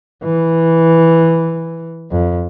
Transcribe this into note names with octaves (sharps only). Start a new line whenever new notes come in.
E3
F2